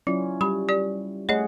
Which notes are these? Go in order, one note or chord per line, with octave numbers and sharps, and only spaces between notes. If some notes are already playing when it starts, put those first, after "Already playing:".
F#3 C#4 E4 F4
G3 G4 B5
G4 D5
A3 G#4 C#5 D#5 F#5